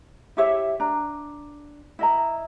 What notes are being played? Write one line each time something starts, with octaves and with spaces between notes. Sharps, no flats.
E4 G4 C#5 E5
D4 A#5
E4 D#5 A#5